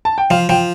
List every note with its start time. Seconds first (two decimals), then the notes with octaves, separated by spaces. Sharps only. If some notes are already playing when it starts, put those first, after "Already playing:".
0.05 A5
0.18 G5
0.31 F3 F5
0.49 F3 G5